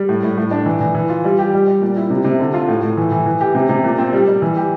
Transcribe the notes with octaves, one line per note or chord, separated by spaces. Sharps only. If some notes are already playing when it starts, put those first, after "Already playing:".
Already playing: G3
A2
A2
A2
D4
E3
E3
E3
F4
G3
G4
G3
G3
A#2
E4
C3
C3
D3
F4
A2
A2
E3
E3
E3
G4
C3
C3
A#2
C4
G3
G3
E3
G4